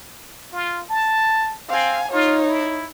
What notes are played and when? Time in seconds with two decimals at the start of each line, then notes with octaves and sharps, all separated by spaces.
0.52 F4
0.90 A5
1.69 C4 F5 G#5
2.12 D#4 F4 C#5
2.46 E4